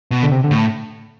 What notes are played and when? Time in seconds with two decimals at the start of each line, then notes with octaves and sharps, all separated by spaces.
0.11 B2
0.23 D3
0.31 C3
0.44 D3
0.51 A2